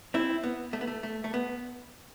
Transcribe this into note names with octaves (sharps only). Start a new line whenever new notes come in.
C4 E4
B3
A3
B3
A3
A3
A3
B3